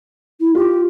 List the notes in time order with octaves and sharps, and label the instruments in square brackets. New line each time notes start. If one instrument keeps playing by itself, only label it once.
[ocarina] E4
[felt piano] F4 [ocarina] G4